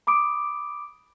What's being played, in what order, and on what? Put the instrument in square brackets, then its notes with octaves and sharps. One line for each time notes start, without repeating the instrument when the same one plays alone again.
[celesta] B5 D6 D#6 D7